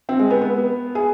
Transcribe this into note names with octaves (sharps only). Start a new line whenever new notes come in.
C4
G#3
B3
B3
G#4